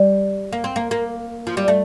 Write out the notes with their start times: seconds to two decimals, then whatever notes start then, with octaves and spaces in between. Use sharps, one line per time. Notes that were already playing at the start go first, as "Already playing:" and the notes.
Already playing: G3
0.52 A#3
0.64 C4
0.76 A#3
0.91 A#3
1.47 F3
1.57 G3
1.68 A3